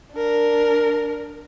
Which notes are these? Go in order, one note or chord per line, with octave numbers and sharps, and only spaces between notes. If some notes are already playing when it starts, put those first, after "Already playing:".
D4 A#4